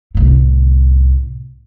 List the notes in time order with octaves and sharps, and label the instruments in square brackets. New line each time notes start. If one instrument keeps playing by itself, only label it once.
[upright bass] C2 A2